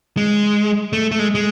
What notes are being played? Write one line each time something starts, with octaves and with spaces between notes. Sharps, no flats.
G#3
A3
A3
G#3
G#3